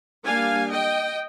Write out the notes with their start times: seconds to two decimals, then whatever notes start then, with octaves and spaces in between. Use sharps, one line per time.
0.24 G3 A#3 D4 F5 G#5
0.71 D#5 G5